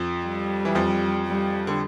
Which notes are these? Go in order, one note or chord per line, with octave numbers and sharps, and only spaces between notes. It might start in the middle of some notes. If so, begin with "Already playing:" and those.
Already playing: F2 F3
G3
E3
F2 F3
G3
D3